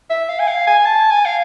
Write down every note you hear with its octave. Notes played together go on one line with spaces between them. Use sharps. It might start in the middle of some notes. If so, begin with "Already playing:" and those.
E5
F5
G#5
F5
G#5
A5
G#5
F5